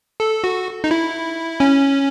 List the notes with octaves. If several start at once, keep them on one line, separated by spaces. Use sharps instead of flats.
A4
F#4
D#4
E4
C#4